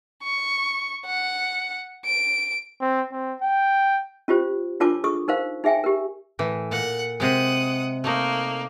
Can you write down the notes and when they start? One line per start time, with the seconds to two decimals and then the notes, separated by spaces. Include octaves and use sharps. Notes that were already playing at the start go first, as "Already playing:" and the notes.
0.23 C#6
1.06 F#5
2.06 D7
2.81 C4
3.12 C4
3.42 G5
4.28 C#4 F4 G4 C5
4.80 D4 F4 A#4 C#5 A5 D6
5.04 G#4 A4 C#6 D#6
5.28 D#4 A#4 C5 F5
5.64 D#4 G#4 E5 G5 G#5
5.84 G4 A#4
6.39 A2 E3
6.71 A#2 F#5
7.20 C3 G#3 F#5 D#6
8.04 A3 A#3 D#4